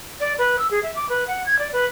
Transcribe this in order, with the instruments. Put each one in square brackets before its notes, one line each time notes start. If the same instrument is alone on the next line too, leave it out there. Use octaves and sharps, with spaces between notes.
[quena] D5
B4
E6
G#4
E5
D6
B4
F#5
G#6
D5
B4